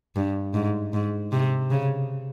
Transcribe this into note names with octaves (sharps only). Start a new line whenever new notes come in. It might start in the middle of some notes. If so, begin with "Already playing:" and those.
G2
G#2
G#2
C3
C#3